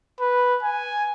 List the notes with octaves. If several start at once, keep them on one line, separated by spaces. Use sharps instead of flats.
B4
G#5